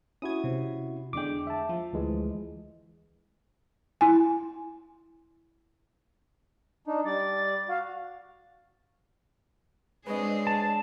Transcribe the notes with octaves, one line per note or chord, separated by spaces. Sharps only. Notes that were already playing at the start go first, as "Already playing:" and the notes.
C#4 E4 F#4 D#6 G#6
C3
E2 D3 G#3 G5 D6
E5 A5
F3
D2 E3 G#3
E4 G#5
D4 D#4
G3 D5 A6
F#4 F5
G#3 C4 D4 G#4 B4 C#5 D#5
A5